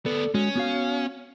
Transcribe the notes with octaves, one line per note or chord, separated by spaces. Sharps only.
D2 B3 A4 D5
G#3 C#4 F#4
B3 F#4 F5